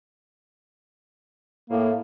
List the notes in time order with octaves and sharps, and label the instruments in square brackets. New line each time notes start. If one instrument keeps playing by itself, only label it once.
[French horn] A2 [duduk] A#3